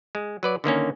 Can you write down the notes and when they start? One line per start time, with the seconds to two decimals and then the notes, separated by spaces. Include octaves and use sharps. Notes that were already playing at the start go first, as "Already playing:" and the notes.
0.15 G#3
0.43 F#3 B4 D5
0.64 D3 D#3 A#3 C#4